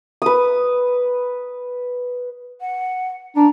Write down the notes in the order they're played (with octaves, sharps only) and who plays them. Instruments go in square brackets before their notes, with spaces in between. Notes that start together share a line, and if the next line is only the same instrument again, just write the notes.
[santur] B4 D#6
[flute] F#5
[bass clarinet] D4 [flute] A#5